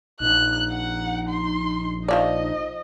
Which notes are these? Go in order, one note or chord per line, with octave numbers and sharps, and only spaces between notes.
A#1 D#4 F#6
F#5
C6
D#3 F3 D5 D#5